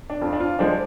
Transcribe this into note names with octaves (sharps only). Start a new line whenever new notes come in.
D4
F2 F4
D4
F4
D3 F3 G#3 D4